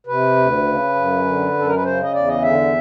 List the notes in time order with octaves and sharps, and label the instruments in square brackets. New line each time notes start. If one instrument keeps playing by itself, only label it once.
[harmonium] C3 B4
D2
C#3
F#2
D3
F#2 A4
A#4
B4
C#3 C5
D#5
E2 D5
D#5
D3 E5